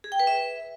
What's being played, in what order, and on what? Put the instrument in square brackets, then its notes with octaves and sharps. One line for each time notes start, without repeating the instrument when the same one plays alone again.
[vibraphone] G#4
G5
B4
E5